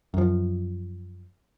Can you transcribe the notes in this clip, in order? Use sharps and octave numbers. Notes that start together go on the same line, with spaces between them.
F#2 F3